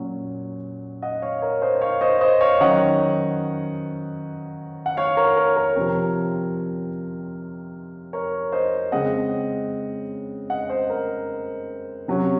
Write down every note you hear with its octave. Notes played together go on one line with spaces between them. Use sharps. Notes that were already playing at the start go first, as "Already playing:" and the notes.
Already playing: A#2 F#3 C#4
D#5 F#5
C#5 F5
A#4 C#5
C5 D#5
C#5 F5
C5 D#5
C5 D#5
C#5 F5
D#3 F#3 C#4 D#5 F#5
F#5
C#5 F5
A#4 C#5
A#4
A#4 C#5
C3 F3 C4 A#4
A#4 C#5
C5 D#5
C#3 G#3 C4 D#5 F#5
D#5 F#5
C5 D#5
A#4
C3 F#3 C#4